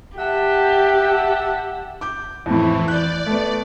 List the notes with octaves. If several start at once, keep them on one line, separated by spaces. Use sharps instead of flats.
G4 E5 F#5 A5
D6 G6
F2 A2 E3
D5 F#6 G6
A3 B3